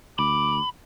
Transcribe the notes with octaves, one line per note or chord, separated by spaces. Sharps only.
D2 B5 D6